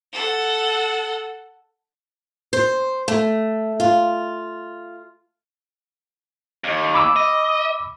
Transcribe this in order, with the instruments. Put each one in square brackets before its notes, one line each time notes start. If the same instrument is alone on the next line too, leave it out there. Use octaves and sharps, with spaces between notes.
[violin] A4 F#5
[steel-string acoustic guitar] C5
A3
F4
[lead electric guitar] D#2
[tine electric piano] B5 D6 E6
[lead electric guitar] D#5